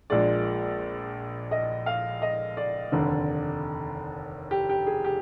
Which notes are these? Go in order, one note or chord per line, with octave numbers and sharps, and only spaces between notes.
A#1 A#2 G#3 D5
D#5
F5
D#5
D5
F1 D#2 D3
G4
G4
G#4
G4